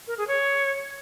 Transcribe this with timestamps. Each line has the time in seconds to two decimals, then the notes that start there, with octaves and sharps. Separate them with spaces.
0.07 A#4
0.18 G#4
0.28 C#5